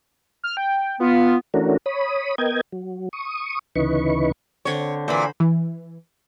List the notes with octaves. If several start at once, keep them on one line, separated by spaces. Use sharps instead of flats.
F6
G5
B3 F4
E3 A3 C#4 D4 F#4 A#4
C#5 B5 D#6
B3 A#4 D#5 G5 G#6
F#3
C#6 D#6
D2 C#3 E3 D#4 B4 C#6
D3 C4 C#5
A#2 E3 C5 B5
E3